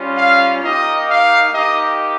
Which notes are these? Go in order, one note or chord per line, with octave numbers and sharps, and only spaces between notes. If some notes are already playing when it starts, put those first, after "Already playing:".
Already playing: G3 C#4 F4
F5
A#3 D#4 G4 D#5
F5
A#3 D#4 G4 D#5